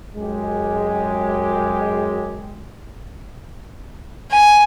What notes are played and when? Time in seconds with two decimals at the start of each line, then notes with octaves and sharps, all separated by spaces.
0.16 F#2 G#3 G4
4.31 G#5